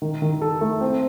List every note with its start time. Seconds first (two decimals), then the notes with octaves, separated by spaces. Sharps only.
0.02 D#3
0.22 D#3
0.42 A4
0.61 A3
0.81 C4